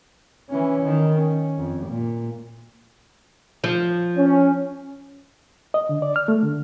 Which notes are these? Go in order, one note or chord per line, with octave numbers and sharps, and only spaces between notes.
E3 C#4
D#3
C#4
F2
A#2
F3
C#4
D#5
D3
D5
F6
A3
D3